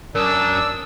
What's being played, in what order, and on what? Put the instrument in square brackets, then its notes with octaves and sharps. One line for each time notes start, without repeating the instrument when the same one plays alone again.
[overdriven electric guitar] F#2 [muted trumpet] D4 [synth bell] A#4 D#6 [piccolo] E6